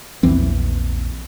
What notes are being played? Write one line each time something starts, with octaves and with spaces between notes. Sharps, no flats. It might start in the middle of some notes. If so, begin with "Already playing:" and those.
A#1 E2 E3 C4